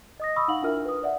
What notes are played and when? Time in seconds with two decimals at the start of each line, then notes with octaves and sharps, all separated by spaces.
0.20 D#5 D#6 A#6
0.36 B5 C#6 D#6 E6
0.48 D#4 F5 F#5 F#7
0.63 D4 E4 F4 A#4 E5 F6
0.85 B4 D#6
1.03 D5 E5 F#5